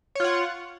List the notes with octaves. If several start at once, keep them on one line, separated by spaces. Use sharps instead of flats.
F4 C#5 F#5